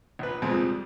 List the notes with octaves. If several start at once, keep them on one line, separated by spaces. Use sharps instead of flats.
A#1 B4
F2 A#2 F3 G#3 C4
G3